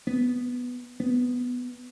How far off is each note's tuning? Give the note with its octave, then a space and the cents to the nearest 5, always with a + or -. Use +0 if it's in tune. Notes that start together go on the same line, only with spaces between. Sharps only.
B3 +0
B3 +5